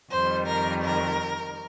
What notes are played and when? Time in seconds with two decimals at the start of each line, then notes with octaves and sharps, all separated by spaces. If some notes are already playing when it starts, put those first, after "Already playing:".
0.11 F2 D#3 G3 C5
0.48 A#4
0.85 A#4